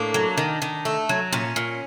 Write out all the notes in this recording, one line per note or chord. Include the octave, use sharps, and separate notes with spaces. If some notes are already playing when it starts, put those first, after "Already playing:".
Already playing: A2 A#3 D4
F#3
D#3
D#3
A3
F#3
A#2 C#4
A#2